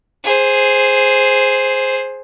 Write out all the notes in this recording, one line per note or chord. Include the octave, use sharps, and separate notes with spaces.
G#4 C5